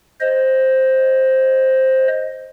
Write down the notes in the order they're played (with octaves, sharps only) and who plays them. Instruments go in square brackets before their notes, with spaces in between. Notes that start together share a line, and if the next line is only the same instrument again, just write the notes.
[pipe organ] C5 D#5